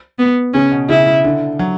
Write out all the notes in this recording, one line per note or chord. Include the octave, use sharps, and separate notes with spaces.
B3
C#3 C#4
B2
C#3 E4
D3
F#3